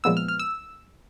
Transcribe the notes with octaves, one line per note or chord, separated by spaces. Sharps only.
A#2 F3 G#3 B3 E6
F6
F6
E6